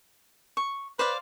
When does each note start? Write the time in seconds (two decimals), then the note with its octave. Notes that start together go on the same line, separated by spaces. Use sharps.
0.57 C#6
0.99 B4 C5 D5 F5